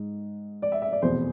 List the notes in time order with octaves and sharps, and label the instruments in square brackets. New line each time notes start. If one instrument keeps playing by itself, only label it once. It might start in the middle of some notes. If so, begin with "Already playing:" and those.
Already playing: [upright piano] G#2
D5
E5
E5
D5
F1 E2 B2 C5